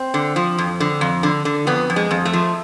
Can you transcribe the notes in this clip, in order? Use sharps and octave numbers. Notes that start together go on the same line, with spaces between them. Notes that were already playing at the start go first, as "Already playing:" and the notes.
Already playing: C4
D3
F3
F2
D3
F2
D3
D3
F2 B3
F2
G#3
F2
A3
F3